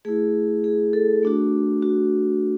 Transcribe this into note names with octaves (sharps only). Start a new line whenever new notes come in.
A3 E4 G#4
G#4
A4
A3 D4 F#4
F#4